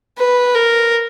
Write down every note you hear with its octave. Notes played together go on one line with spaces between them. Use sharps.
B4
A#4